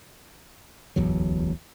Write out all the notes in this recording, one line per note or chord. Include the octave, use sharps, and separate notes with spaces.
D1 A1 E2 F#3